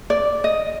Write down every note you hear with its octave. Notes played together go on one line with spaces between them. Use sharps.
D5
D#5